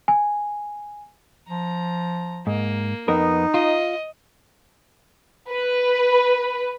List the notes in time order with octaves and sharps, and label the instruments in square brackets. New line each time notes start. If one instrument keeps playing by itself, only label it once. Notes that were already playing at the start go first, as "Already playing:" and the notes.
[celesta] G#5
[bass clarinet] F3 [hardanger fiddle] A#5
[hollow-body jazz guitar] G#2 [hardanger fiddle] A#3
[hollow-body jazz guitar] F2 B3 A#4 [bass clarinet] D#4
[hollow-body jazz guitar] F4 [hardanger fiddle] D#5
[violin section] B4